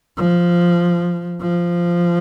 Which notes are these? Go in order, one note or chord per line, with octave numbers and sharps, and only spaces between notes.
F3
F3